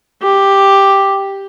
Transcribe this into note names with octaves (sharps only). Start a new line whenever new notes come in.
G4